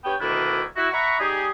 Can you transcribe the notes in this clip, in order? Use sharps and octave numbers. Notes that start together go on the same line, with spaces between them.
G2 B3 C#5 G5
D2 B2 D#3 A#3 D4 E4
E4 F#4
E5 F#5 A#5 B5 C#6
G3 D#4 G4 G#4